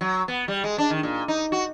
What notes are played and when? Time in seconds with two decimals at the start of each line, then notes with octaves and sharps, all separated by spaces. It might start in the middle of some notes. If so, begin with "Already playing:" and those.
0.01 F#3
0.28 B3
0.48 G3
0.64 G#3
0.78 D4
0.90 D#3
1.03 A#2
1.28 D#4
1.52 F#4